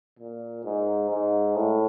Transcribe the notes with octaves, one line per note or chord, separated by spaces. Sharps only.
A#2
G#2
G#2
A2